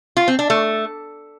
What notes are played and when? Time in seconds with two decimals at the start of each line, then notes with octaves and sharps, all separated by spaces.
0.17 F4
0.28 C4
0.39 D4
0.50 A3